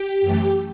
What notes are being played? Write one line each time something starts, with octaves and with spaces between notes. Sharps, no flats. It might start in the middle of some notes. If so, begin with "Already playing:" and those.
Already playing: G4
F#2 E3 A3